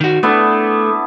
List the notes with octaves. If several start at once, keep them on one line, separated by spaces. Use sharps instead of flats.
D#3 F#4
A3 B3 D4 E4